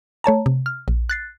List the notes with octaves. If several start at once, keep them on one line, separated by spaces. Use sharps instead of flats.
A3 C#5 A5 A#5
C3
F6
A#1
F#6 A6 C7